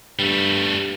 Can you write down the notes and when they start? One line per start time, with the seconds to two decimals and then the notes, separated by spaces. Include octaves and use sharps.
0.19 G2 G3 A3